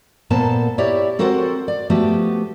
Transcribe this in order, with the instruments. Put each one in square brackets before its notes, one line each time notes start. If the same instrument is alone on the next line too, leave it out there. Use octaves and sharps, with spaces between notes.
[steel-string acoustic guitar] A#2 A#3 B3 A4 C5 A5
E4 G4 C#5 D5
C4 F#4 A4 A#4 C5 F#5
D5
F3 A3 B3 F#4 G4